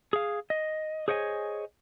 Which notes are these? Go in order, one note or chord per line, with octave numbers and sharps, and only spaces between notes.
G#4 F5
D#5
G#4 C5 C#5 D#5 G5 G#5